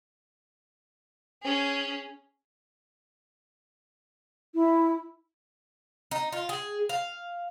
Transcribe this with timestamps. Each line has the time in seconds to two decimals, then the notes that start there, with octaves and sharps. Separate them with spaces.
1.43 C#4 G#4
4.54 E4
6.11 D#4
6.32 F4
6.49 G#4
6.89 F5